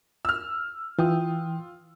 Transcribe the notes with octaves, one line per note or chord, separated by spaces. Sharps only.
E6 F6
E3 F4 G5 D#6